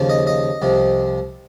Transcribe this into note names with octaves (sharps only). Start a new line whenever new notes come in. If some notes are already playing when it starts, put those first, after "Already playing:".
Already playing: D#2 C#3 F3
D#5
D#5
C2 C3 F3